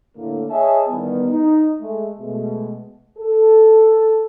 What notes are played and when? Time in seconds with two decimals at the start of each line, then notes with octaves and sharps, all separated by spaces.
0.16 A2 D3 A#3
0.50 G#4 C#5 D#5 E5 G#5 A5
0.88 D#3 E3 G3 B3
1.29 D#4
1.80 G#3 A3
2.19 B2 G#3 A3
3.17 A4